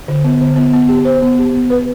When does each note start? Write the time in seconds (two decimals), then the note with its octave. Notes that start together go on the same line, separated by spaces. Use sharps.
0.08 D3
0.24 B3
0.41 D3
0.56 B3
0.73 B3
0.89 G4
1.05 C5
1.22 B3
1.39 G4
1.54 B3
1.70 B4